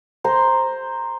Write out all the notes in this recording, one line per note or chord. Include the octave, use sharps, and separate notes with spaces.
C5 A#5 C6